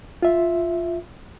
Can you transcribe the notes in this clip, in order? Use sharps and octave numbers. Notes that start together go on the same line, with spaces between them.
F4 E5